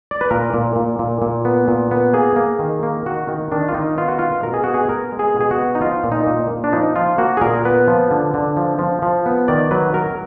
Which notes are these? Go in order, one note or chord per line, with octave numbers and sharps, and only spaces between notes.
D5
B4
A#2 A#4
A#2
A#2
A#2
A#2
B3
A#2
B3
A#3 G#4
A#3
D#3
A#3
D#3 F#4
D#3
D#3 D4
F4
D#3 D#4
B3 F4
F#4
B2 F4
B2 A#4
G#4
B3 F#4
G#4
B3 A#4
G#3
G#4
B2
G#4
F#4
B3
D#4
F3 F4
A#2
D#4
A#2
A#2
D4
F3 D#4
F3 F4
A#3 F#4
G#4
A#2 A#4
B3 B4
F3
D3
D3
F3
F3
F3
B3
D#3 D5
F#3 B4
F#3 A#4